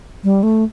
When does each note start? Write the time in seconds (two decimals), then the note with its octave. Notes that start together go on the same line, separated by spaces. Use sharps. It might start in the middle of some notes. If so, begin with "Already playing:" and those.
0.24 G3
0.43 A3